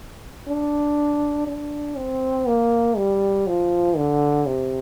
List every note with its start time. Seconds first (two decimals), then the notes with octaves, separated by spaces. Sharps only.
0.47 D4
1.47 D4
1.97 C4
2.47 A#3
2.97 G3
3.47 F3
3.96 D3
4.47 C3